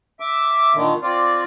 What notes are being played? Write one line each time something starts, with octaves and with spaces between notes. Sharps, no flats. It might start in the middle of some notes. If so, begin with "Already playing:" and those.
E5 D6
A#2 D3 D#3
C4 F4 D5